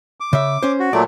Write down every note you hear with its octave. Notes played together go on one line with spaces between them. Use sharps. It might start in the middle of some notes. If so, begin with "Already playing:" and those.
D6
C#3 E5
C#4 C5
F#4
A#2 F#3 A3 D5